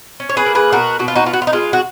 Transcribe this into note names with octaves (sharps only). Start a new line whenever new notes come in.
C#4
C#5
G#4 B4
A#3
G#4 B4
B2 F#4 A#4
B2 F#4
F4
D#4 F#4
B3 F4
F#4
F4
D#4
G#3 F4
F#4